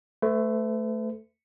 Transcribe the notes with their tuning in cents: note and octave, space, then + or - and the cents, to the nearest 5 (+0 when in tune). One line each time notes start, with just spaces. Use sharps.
A3 +0 B4 +45